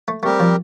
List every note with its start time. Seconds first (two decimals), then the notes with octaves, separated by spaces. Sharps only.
0.08 A3
0.23 G3 A3 C4 G4 A#4
0.40 F3